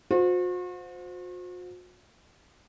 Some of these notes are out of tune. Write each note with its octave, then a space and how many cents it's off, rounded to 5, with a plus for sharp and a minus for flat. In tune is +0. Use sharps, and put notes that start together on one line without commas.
F#4 -45 C5 -10